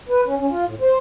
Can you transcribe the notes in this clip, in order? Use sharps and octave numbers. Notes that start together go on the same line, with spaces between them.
B4
C#4
C#4
F4
A2
C5